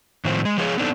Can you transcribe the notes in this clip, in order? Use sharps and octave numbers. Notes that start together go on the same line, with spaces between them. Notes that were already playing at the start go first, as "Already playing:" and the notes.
A2 D#3 F3 C4
G#3
F3 G#3 B3 F4 G#4 C#5
B3 C4 D4 D#4 A4